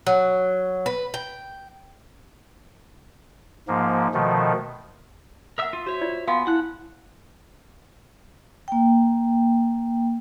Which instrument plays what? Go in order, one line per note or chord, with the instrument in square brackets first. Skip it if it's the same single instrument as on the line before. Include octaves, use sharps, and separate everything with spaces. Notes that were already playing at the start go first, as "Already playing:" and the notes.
[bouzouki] F#3
B4
G5
[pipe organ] G#2 F3 A#3
B2 D#3 F3 A3
[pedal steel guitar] A#4 E5 E6 [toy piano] F#5 D#6
[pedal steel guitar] F4
[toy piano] F#4 [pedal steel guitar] C5 C#5 E5
[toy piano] F4 D5
[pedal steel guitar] B3 [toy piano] F5 G#5 C6
[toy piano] E4 [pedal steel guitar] F#5 A5 F#6
[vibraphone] A#3 G5